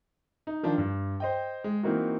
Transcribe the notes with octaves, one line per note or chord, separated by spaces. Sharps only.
D#4
D#3 F3 D4 F4
G2
C5 D#5 G5
G#3
E3 A#3 C4 D#4 F#4